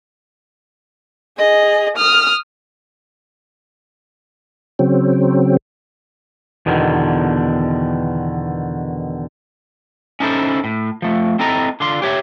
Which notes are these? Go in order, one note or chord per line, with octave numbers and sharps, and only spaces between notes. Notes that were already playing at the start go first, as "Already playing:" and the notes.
G#4 D#5
D#6 F6
C#3 F#3 C4
E2 B2 D3 D#3
C#4 D#4 E4 A4 C5
A2
F3 A3
C4 E4 A4 D#5 A#5
D3 D4 F4 C6
G4 C#5 E5